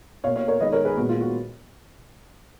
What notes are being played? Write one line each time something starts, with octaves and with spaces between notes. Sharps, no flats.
B2 A#3 C#5 F5
C#5 F5
A#4 C#5
D#3 G#3 B3 B4 D#5
A#4 C#5
G#4 B4
A#2 G#3 B3 F#4
F4
F#4